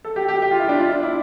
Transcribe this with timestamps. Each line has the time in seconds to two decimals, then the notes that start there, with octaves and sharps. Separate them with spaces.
0.05 A4
0.16 G4
0.28 G4
0.42 G4
0.51 F4
0.60 E4
0.69 D4
0.79 F4
0.91 D4
1.03 E4